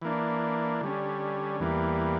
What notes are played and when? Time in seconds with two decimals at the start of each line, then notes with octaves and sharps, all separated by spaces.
0.02 E3 A#3 D4
0.81 D3 G3 C#4
1.60 E2 E3 G3 A#3